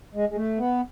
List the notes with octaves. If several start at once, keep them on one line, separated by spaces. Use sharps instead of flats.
G#3
G#3
A3
B3